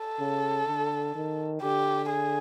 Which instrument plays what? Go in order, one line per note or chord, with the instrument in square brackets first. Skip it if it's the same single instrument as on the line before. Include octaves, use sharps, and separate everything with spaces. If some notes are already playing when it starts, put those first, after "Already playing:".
Already playing: [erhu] A4
[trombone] C#3
D3
D#3
[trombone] D3 [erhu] G4
[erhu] G#4